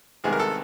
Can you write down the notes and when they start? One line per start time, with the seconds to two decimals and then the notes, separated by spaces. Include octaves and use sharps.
0.24 C2 C3 D#3 G#3 B3 G#4
0.33 A#4
0.40 A4